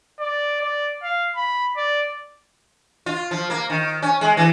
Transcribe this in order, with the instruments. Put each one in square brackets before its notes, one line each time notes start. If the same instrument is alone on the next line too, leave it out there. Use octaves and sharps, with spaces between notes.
[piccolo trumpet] D5
D5
F5
B5
D5
[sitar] F4
F3
A#3
D#3
C#4
G#3
E3